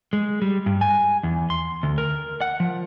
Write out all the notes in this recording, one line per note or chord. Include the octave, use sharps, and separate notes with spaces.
G#3
G3
G2
G#5
E2
C6
D2
A#4
F#5
F3